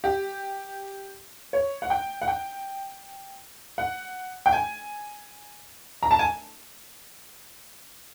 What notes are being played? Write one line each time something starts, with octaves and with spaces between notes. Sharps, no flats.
G4
C#5
F#5
G5
F#5
G5
F#5
G5
G#5
A#5
A5
G#5